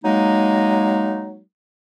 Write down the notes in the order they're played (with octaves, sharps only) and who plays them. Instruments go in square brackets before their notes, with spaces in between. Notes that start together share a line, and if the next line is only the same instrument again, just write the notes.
[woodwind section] F#3 G#3 A#3 D#4